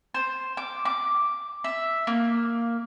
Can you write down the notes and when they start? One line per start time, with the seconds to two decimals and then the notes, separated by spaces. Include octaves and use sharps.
0.14 C5
0.57 D6
0.85 D6
1.64 E5
2.07 A#3